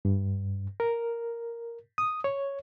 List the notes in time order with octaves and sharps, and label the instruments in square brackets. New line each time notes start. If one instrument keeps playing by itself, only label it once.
[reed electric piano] G2
A#4
D#6
C#5